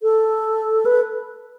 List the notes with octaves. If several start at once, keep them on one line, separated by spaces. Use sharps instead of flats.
A4
B4